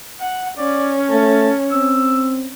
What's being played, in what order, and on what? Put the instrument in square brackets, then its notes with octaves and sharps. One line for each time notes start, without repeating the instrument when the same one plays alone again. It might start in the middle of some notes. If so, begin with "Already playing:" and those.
[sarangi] F#5
[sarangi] C#4 [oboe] D5
[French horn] A3 [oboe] A5
[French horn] C4 [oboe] E6